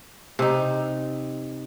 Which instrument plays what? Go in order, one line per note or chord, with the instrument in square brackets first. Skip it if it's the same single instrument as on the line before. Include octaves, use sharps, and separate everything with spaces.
[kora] C3 D#4